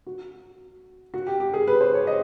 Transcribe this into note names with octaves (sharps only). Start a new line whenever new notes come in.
F#4
F#4
G4
G4
G#4
B4
C5
C#5
D#5